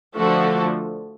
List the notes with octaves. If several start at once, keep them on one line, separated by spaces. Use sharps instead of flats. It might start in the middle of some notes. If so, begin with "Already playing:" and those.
D3 F3 A3 F#4 A4